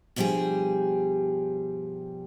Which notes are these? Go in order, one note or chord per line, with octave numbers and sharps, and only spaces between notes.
G2 B2 F3 G3 G4 G#4